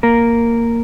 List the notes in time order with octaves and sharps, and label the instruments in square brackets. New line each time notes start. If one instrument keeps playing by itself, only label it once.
[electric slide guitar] A#3 A#4